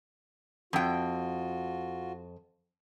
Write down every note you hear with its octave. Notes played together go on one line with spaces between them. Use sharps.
F2 F4 F#4 G5